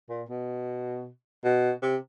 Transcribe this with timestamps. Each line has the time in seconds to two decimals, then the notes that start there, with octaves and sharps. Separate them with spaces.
0.09 A#2
0.29 B2
1.44 B2
1.83 C3